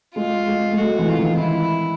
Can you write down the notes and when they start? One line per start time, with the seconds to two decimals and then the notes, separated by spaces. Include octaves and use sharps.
0.16 G#3 F4
0.48 G#3
0.72 G#3
0.77 A3 F#4
0.98 E3
1.08 F4
1.19 D#3
1.39 E4